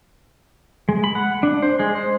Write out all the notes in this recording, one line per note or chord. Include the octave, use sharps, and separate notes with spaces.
G#3
B5
F#5
D4
C5
G#3
C5